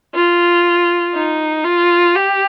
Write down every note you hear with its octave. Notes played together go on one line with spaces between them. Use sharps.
F4
D#4
F4
G4